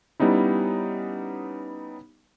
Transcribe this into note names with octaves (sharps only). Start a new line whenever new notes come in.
G3 B3 C#4 D#4 E4